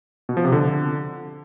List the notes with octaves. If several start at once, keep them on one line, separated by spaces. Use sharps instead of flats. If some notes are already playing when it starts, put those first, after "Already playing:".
B2
F3
C3
D3